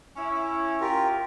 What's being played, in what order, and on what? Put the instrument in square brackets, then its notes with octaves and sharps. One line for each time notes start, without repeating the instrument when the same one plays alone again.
[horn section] C#4 E4
[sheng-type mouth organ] F4 G4 A#4